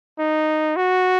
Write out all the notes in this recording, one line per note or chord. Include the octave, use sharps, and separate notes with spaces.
D#4
F#4